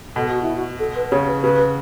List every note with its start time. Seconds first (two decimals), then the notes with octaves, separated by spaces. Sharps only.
0.16 B2 A4
0.29 F#4
0.42 E4
0.56 F#4
0.80 A4
0.96 B4
1.11 C#3 C#5
1.27 B4
1.44 C#3 B4